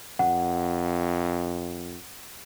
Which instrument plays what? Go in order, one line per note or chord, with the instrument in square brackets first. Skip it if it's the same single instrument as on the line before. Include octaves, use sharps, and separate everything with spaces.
[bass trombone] F2 [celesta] F#5